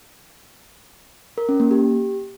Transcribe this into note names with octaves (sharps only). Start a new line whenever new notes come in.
A#4
C#4
A#3
G4